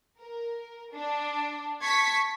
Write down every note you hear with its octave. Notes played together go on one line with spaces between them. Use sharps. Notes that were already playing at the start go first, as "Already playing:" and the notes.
A#4
D4
A5 C#6 G#6 B6